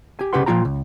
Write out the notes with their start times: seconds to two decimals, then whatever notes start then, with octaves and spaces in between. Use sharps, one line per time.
0.19 G4 G#5
0.33 C2 C#3 G4 B4 F#5 C6
0.46 A#2 F3 B3 F4 G5 A#5
0.65 C#2